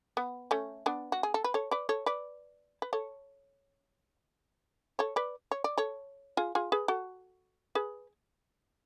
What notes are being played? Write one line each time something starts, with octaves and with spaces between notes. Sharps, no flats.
B3
A3 C#4
B3 D4
F#4
G#4
A4
B4
A4 C#5
B4 D5
A4 C#5
B4 D5
B4
A4 C#5
A4 C#5
B4 D5
C#5
D5
A4 C#5
F4 G#4
F4 G#4
G#4 B4
F#4 A4
G#4 B4